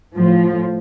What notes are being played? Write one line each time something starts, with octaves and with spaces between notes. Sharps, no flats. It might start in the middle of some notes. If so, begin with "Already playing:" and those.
A2 F3